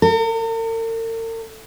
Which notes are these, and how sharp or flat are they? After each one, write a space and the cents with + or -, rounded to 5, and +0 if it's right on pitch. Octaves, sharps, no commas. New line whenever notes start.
A#4 -45